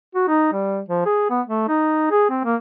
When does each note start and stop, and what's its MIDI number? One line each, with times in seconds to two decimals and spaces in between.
0.15 0.25 66
0.28 0.49 63
0.53 0.80 55
0.88 1.02 53
1.05 1.27 68
1.30 1.41 59
1.47 1.66 57
1.68 2.07 63
2.11 2.24 68
2.29 2.42 60
2.45 2.55 58